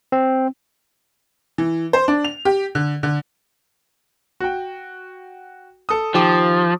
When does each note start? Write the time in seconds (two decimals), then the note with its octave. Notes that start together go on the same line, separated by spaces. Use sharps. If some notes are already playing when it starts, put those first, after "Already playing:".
0.12 C4
1.58 E3
1.93 C5
2.08 D4
2.25 F7
2.45 G4
2.75 D3
3.03 D3
4.40 F#4 G5
5.89 A4 D#6
6.14 D#3 F3 G4 D6